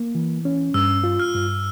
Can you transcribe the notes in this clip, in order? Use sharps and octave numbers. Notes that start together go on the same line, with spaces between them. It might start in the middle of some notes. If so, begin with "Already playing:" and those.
Already playing: A#3
E3
C#4
G2 E6
F4
F6
G2